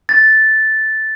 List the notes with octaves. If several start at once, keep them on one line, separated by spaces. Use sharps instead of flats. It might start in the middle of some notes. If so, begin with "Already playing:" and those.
A6